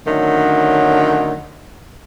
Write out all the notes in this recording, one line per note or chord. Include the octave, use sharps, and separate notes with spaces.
D3 D#3 F#3 A3 C#4